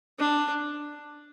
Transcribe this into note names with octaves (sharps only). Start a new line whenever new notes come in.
D4